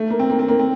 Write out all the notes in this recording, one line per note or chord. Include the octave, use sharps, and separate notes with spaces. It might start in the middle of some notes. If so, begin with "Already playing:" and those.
Already playing: A3
A#3
C4
A#3
C4
A#3
C4